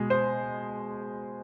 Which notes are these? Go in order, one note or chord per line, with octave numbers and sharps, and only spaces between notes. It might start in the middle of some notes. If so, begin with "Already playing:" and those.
Already playing: B2 G#3
C5